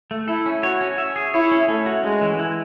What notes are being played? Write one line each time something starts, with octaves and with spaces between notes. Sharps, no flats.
A3
E4 A4
C#4
F#4 C#5
C#4
E5
G#4
E4 C#5
C#4
A3 C#4
F#4
G#3 C#4
E3
E4